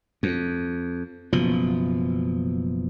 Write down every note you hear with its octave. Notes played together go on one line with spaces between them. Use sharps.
F2
F#1 B2 F3